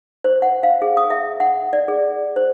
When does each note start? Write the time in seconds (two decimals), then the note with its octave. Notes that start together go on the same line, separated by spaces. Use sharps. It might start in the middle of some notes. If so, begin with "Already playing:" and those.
0.24 C5
0.42 F#5
0.63 F5
0.82 G#4
0.97 D#6
1.10 E5
1.40 F#5
1.73 D5
1.88 G#4
2.36 C5